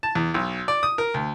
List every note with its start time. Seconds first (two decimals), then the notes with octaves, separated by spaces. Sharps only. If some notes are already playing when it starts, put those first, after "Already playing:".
0.03 A5
0.15 E2
0.34 B1
0.68 D5
0.83 D#6
0.98 A#4
1.14 D2